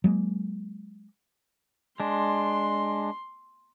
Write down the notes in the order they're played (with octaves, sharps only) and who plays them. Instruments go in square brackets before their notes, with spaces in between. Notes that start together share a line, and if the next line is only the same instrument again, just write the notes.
[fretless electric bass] F#3 G#3 A#3
[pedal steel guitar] G#3 D4 [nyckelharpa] C6